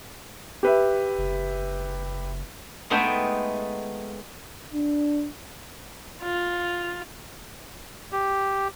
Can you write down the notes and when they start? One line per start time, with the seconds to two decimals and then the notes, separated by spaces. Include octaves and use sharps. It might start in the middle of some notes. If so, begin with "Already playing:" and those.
0.63 G4 B4 E5
1.18 F#1
2.90 G#3 A3 B3 D#4 E5 G5
4.74 D4
6.23 F4
8.12 G4